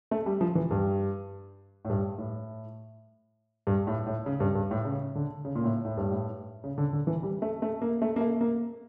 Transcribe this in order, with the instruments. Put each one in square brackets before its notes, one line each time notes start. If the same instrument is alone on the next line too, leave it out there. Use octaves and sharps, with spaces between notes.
[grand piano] A3
G3
F3
E3
G2
A2
G2
A2
G2
A2
A2
C#3
G2
G2
A2
C#3
D3
C#3
A#2
A2
A2
G2
A2
C#3
D3
D3
E3
G3
A3
A3
A#3
A3
A#3
A3
A#3